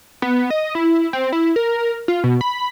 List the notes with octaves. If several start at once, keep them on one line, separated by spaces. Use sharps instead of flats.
B3
D#5
E4
C4
E4
A#4
F4
B2
B5